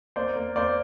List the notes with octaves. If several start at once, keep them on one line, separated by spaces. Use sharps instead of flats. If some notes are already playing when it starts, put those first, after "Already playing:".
A#3 C5 D5
A#3
A#3 C5 D5